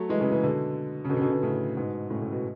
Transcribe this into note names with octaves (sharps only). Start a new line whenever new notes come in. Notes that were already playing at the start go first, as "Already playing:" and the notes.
Already playing: F#3 A3
E3 G#3
C#3 E3
C#3 E3
B2 D3
C#3
B2 D3
C#3
B2 D3
B2 D3
A2 C#3
G#2 B2
A2 C#3
A2 C#3
B2